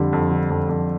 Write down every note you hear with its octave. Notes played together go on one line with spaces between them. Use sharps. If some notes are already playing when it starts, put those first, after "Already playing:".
Already playing: F2 D3 G3
F2
D3
F2
F2